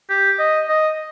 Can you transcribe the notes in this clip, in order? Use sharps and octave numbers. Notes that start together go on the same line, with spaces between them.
G4
D#5
D#5